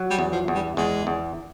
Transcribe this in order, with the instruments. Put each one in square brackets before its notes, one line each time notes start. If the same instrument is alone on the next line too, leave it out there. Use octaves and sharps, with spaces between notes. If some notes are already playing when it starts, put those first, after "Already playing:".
Already playing: [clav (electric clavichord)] F#3
[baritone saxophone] G3
[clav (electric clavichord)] E2
[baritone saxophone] F3
[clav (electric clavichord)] E2
[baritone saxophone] G3
[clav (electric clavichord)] E2 [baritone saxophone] G#3
[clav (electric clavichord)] E2